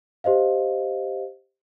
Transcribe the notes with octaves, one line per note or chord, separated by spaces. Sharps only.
G4 C5 D#5 F5